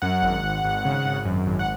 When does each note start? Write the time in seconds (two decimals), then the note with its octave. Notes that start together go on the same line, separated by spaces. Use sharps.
0.02 F#2 F#5
0.22 G#1
0.43 G#1
0.64 G#1
0.85 C#3
1.05 G#1
1.25 F#2
1.46 G#1
1.59 F#5